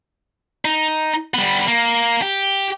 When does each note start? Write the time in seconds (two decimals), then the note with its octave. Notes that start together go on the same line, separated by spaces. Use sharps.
0.65 D#4
1.34 G3 B3
1.68 A#3
2.22 G4